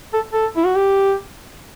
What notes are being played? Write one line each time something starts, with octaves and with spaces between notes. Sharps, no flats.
A4
A4
E4
F#4
G4